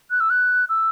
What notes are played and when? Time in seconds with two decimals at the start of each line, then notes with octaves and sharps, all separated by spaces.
0.11 F#6
0.20 E6
0.30 F#6
0.69 E6